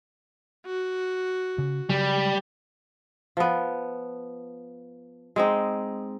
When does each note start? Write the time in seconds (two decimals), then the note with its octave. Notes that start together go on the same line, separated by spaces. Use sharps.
0.66 F#4
1.58 C#3
1.90 C#3 F#3 G3
3.37 F3 B3
5.36 G#3 C4 D#4